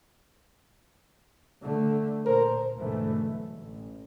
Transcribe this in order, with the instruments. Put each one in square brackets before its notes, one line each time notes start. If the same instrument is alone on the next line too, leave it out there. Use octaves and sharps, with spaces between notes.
[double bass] D3 A3
[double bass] A#2 [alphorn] A#4 [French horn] C5
[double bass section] D2 G#2 B2 D3 E3 A3
B1
A1